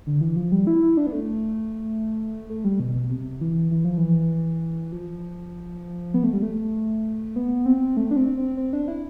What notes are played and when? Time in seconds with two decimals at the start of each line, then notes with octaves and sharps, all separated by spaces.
0.07 D3
0.21 E3
0.36 F3
0.52 G3
0.67 E4
0.82 E4
0.97 D4
1.07 B3
1.13 A3
2.50 A3
2.64 G3
2.80 B2
2.95 B2
3.10 C3
3.41 E3
3.71 E3
3.85 F3
3.98 E3
4.92 F3
6.14 B3
6.24 A3
6.33 G3
6.42 A3
7.36 B3
7.66 C4
7.97 A3
8.11 D4
8.16 C4
8.37 C4
8.57 C4
8.73 D4
8.88 E4